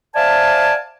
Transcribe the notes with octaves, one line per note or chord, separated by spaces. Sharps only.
C5 D5 E5 F5 G#5 A5